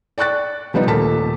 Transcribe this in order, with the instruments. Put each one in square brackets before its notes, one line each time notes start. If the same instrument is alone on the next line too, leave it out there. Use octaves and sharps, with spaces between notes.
[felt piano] D5 G5 C#6 F#6 A6
F3 G3 B3 D#4
D#1 A3 A#4 A5 B6